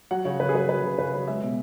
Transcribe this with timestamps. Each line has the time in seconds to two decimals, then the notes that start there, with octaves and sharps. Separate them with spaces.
0.11 F#3 F#5
0.25 C#3 C#5
0.40 C#3 B4
0.49 G#4
0.54 F#3 B4
0.69 F#3 B4
0.84 C#3
0.99 C#3 B4
1.14 F#3
1.28 G#3 E5
1.42 B2